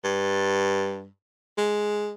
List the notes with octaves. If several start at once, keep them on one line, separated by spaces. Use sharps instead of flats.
G2
G#3